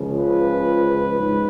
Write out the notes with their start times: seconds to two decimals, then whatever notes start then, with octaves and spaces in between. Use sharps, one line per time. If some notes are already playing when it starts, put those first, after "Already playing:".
Already playing: C#2 C#3 F3
0.17 B4
1.19 G#2